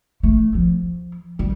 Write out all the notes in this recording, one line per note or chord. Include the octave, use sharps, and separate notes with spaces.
A3
F3
G3